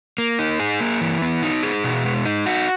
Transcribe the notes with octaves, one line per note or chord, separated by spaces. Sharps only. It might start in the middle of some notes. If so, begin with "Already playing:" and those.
A#3
D#4
G#4
A#3
E3
B3
D#4
G#4
B2
G#3
D#4
F#4